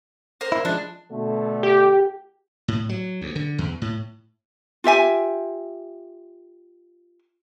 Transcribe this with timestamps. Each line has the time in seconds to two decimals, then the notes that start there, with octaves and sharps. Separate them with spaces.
0.41 A#4 C5
0.52 E4
0.65 F3 G#3 D4
1.11 B2 D3 A3
1.63 G4
2.68 A2
2.89 F#3
3.21 D2
3.36 D3
3.58 E2
3.82 A2
4.84 F4 G4 E5 G#5